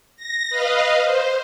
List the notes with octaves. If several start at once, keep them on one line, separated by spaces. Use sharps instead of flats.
A#6
B4 D#5 F5
C5